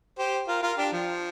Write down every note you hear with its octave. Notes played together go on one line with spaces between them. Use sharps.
G4 C5
F4 A#4
F4 A#4
D4 G4
F3